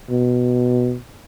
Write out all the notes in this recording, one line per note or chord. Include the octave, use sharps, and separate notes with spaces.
B2